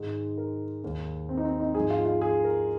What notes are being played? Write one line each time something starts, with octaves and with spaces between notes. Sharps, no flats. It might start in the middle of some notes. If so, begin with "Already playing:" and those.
Already playing: G#2 D#3 G#3
A#4
D#2 D#3 G#3
C4
D#4
C4
D#4
G#2 F3 G#3 G#4
F4
F4
G#4
A#4